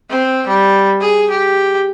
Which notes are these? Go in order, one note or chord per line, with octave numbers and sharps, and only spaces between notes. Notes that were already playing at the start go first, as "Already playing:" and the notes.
C4
G3
G#4
G4